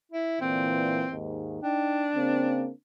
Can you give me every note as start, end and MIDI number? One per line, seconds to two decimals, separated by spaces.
0.12 0.38 64
0.41 1.06 46
0.41 1.06 50
0.41 1.06 52
0.41 1.14 60
1.12 1.62 39
1.12 1.62 44
1.63 2.74 62
1.63 2.07 63
1.63 2.07 79
2.15 2.70 49
2.15 2.70 58
2.15 2.70 60